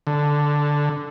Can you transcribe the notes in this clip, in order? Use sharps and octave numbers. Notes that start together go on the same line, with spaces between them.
D3